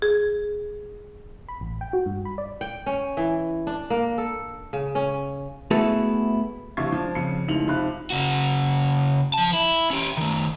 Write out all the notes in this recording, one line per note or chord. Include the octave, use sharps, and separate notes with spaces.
G#4
B5
A1
G5
F#4
G2
B5
D5
G5
C#4
E3
D4
A#3
A4
C#3
C#4
A3 B3 E4 F#4 G#4 A4
A1 C3 D4 F5 C#6 G#6
F3 D4
F2 C#3 C#7
F1 C#2 D#4 E4 F7 F#7
C3 F3 D#4 F5 B5 F#6
C#3 F#4
F3 A5
E4
C#4 G4
D#3 A3